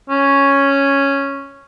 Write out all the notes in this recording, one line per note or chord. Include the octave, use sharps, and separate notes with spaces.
C#4